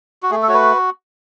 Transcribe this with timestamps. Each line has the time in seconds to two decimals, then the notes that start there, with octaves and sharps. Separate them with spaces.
0.23 F#4
0.31 A3 G#4
0.43 A4
0.48 F#4 C#5
0.54 B4